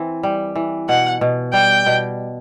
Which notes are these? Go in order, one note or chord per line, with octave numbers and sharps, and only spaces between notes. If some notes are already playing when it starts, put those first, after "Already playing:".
Already playing: E3 C4
G3
E3
B2 F#5
B2
G3 G5
B2